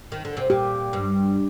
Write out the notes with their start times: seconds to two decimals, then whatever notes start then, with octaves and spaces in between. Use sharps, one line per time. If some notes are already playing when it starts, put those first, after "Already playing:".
0.12 D#3
0.25 D3
0.37 C3
0.50 A#2 G4
0.93 G2